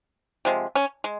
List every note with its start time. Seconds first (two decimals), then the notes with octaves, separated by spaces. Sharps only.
0.45 C3 F3 G#3
0.75 C#4
1.04 G#3